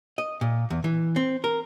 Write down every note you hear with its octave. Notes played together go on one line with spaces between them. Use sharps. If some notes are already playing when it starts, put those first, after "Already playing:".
D#5
A#2
E2
E3
C4
A#4